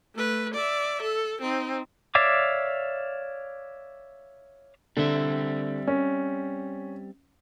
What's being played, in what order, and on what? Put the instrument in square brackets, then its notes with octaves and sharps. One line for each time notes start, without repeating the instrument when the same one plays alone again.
[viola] A3 B4
D5 E5
A4
C4 D#4
[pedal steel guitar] C#5 D5 E5 F5 D6
[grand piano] D3 [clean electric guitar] G3 C4 E5
[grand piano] C#4